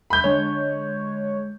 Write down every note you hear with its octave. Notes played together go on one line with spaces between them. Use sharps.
B5 G6
D3 G#3 C#5